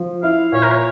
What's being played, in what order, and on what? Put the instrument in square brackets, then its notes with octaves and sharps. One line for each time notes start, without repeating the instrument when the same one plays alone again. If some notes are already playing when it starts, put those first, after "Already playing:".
Already playing: [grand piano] F3
[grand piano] E4 [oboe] F5
[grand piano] A#2 [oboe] C#5
[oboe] A#4
C#5